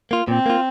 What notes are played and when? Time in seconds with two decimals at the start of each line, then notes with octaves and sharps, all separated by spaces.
0.11 A#3 F4
0.28 A#2 C4
0.46 A#3 F4